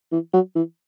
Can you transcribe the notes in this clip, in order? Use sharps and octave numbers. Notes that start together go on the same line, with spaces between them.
E3
F#3
E3